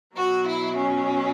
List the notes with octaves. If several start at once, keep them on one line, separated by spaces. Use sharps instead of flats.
B2 F#3 F#4
E4
C#4